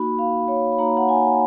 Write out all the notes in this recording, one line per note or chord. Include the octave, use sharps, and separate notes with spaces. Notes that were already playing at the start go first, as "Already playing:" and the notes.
Already playing: A#3 D#4 F#4 B5
F5
C#5
B5
A#3 D#4 F#4 A#5
F#5
G#5